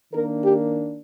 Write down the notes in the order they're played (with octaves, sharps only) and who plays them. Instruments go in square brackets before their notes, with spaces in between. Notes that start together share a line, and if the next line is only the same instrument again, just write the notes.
[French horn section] D#3 A#3 D4 A#4
G4